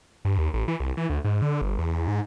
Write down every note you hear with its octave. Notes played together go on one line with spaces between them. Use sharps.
G2
D#2
A1
E3
C2
E3
D2
G#2
D3
G1
E2
G#2